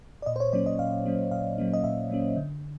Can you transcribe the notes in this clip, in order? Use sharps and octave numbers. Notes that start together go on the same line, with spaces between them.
D5
A#2 D#5
C5
C#5
F#3 A#3 C#4 D5
D#5
A#2 F5
F#3 A#3 C#4
A#2 F5
F#3 A#3 C#4
D#5
A#2 E5
F#3 A#3 C#4
D3